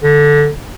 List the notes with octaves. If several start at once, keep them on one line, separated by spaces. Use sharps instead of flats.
D3